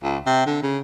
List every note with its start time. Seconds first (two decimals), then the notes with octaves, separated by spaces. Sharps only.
0.03 C#2
0.27 C3
0.46 D3
0.63 C#3